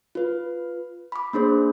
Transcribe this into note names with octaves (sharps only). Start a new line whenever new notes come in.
F4 B4
B5 D6
A#3 D4 G#4 C5